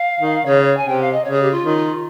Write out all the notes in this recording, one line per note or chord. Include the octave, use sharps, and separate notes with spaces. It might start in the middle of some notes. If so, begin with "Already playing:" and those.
Already playing: F5
D#3
C#3 C#5
G#5
C3 G5
F5
D#5
C#3 C#5
G#4
G4
F4
D#3
F4